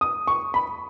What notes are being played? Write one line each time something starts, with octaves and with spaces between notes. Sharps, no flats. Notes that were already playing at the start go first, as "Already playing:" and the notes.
D#6
C#6
B5